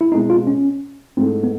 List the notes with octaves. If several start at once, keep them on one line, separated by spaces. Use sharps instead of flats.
E4
B2 G#3 C4 D#4
F4
C#4
G#2 E3 A3 C4
B3